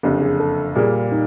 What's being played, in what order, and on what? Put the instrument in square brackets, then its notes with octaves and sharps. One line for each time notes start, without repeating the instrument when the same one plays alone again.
[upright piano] F#1 F2 D3 [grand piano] G4
[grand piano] G#4
A4
[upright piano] A#2 G3 A#3 [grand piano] G#4
[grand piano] D#4